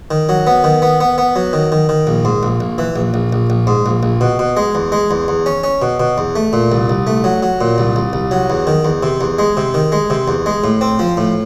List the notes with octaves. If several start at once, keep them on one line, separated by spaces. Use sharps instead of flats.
D#3
F#3
B3
D#3
B3
B3
B3
F#3
D#3
D#3
D#3
A#1
G#2
A#1
A#1
E3
A#1
A#1
A#1
A#1
G#2
A#1
A#1
B2
B2
G#3
E2
G#3
E2
E2
C#4
C#4
B2
B2
E2
A3
A#2
C2
C2
A3
F#3
F#3
A#2
C2
C2
C2
F#3
E2
D#3
E2
C3
E2
G#3
C3
D#3
G#3
C3
E2
G#3
A2
C4
F3
A2